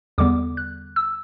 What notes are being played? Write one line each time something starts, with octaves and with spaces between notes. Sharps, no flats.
E2 D3 G3 B3 D6
F#6
E6